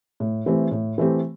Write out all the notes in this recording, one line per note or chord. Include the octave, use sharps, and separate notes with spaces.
A2
E3 A3 C4 G4
A2
E3 A3 C4 G4